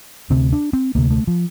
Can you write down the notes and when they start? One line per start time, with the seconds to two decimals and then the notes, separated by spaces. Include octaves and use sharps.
0.30 D2 C3 C4
0.53 D4
0.73 C4
0.95 D2 C3 A#3
1.10 A3
1.27 F3